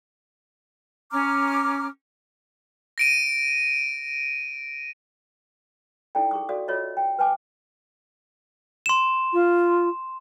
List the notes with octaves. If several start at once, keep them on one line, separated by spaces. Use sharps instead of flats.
C#4 A#5 D6 F6
A#6 D7 D#7
D#4 E4 A4 D5 G5
G#4 C#6 D#6
F#4 A4 D5 F5 D#6
F4 F#4 A4 C#5 D#5 E5
G5
B4 G5 G#5 D6 D#6
C6 E7
F4